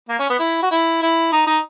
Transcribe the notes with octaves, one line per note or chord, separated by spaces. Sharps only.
A#3
C#4
B3
E4
F#4
E4
E4
D#4
D#4